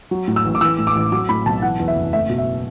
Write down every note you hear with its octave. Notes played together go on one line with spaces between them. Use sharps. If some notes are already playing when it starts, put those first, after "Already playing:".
F#3
A2
E6
A1
D6
E3 E6
A2
D6
A1
F#3 D6
A2 B5
B1 A5
E3 F#5
E2
E5
F#1
A3 E5
B2
E5